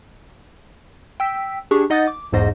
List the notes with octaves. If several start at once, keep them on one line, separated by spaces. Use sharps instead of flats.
G5 E6 B6
D4 G4 G#4 C#6
D#4 D#5 F#5 D#6 G6 A6
D6
B1 E2 G#2 C5 D#5 A#6